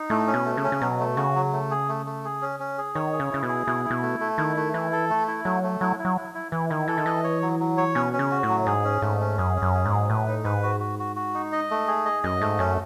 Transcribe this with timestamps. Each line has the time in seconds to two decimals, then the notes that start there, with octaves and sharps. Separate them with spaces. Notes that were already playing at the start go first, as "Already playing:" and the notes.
Already playing: D#4
0.10 A2 A3
0.27 C#4
0.34 B2
0.46 A3
0.57 C#3
0.64 C#4
0.72 C#3
0.81 B2 F#3
0.99 A3
1.17 C#3 F#4
1.35 F#3
1.53 A3
1.71 G#4
1.89 A3
2.06 A3
2.25 G#4
2.42 C#4
2.60 C#4
2.78 G#4
2.95 D#3 C#5
3.13 G#4
3.20 C#3
3.31 C#3 E4
3.43 B2
3.49 G#4
3.66 B2 E4
3.85 E4
3.90 B2
4.03 A3
4.20 A3
4.38 D#3 E4
4.57 A3
4.74 E3 E4
4.92 A4
5.10 A3
5.28 E4
5.45 F#3 A3
5.63 A3
5.81 F#3 E4
5.99 E4
6.05 F#3
6.17 E4
6.35 E4
6.52 E3 E4
6.70 D#3 E4
6.88 E3 A4
6.98 D#3
7.06 E3 D#5
7.24 C#5
7.42 F#3
7.60 F#3
7.77 C#5
7.95 B2 C#4
8.13 C#4
8.19 C#3
8.31 F#4
8.43 A2
8.49 F#3
8.66 G#2 G#4
8.84 C#4
9.02 G#2 A3
9.21 C#4
9.38 F#2 G#4
9.56 C#4
9.62 F#2
9.74 G#4
9.86 G#2
9.91 F#3
10.09 A2 B4
10.28 D#4
10.45 G#2 B4
10.63 F#4
10.80 F#4
10.99 F#4
11.16 F#4
11.34 D#4
11.52 D#5
11.71 A3
11.88 G#4
12.06 D#5
12.23 F#2 D#5
12.41 G#2 A3
12.59 F#2 C#4